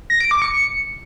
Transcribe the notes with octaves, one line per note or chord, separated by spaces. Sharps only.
A#6
D7
D6
C#7